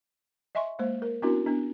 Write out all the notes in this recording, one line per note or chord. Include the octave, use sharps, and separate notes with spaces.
D#5 E5 G#5 C6 C#6
G#3 A#3 C5
A#4
B3 C#4 D4 E4 F#4 A#4
B3 D4